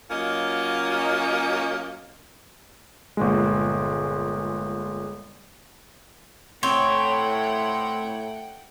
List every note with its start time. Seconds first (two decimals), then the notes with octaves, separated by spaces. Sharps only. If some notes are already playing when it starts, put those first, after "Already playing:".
0.11 F#3 A#3 C#4 F4 D#5
3.17 G1 A#2 G#3
6.63 A2 C4 C#5 F#5 G5